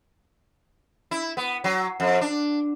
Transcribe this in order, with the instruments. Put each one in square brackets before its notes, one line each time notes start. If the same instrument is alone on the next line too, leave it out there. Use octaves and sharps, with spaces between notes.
[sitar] E4
B3
F#3
F2
D4